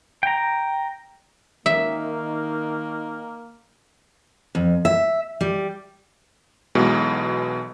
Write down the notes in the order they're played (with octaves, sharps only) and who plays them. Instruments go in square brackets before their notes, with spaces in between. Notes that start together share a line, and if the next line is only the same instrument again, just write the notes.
[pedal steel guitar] G5 A#5
[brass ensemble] D#3 [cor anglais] A#3 [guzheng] E5
[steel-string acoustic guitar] F2
E5
G3
[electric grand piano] B1 B2 E3 G#3 B3